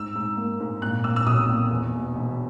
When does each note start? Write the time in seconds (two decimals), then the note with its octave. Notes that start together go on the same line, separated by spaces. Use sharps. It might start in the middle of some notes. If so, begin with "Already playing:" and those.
Already playing: G#2 E6
0.16 G#2
0.37 A#3
0.60 G#2
0.82 A#2 F#6
1.04 A#2 E6
1.16 E6
1.26 B1 D#6
1.49 A#2
1.71 E2
1.93 E1
2.15 E1